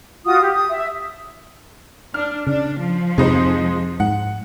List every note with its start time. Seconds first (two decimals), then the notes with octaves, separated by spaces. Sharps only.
0.24 F4 F#4 D#6
0.40 G4
0.53 D#6
0.70 E5
2.14 D4 F6
2.47 C#3 D4
2.78 F3
3.18 F2 C3 G#3 D#4 C5
4.00 G#2 F#5